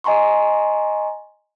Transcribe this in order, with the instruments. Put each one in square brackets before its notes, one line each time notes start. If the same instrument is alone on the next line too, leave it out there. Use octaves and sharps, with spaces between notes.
[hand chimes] D#5 G#5 A#5 C6 C#6